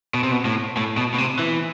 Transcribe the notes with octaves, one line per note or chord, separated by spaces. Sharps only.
B2
C3
B2
A2
A2
B2
B2
C3
E3